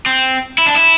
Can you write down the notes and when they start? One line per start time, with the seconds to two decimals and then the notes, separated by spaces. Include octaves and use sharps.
0.06 C4
0.58 E4
0.66 D4
0.75 E4